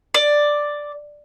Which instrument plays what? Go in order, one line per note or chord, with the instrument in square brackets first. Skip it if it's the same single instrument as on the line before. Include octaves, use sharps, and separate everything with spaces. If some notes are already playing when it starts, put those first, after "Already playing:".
[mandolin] D5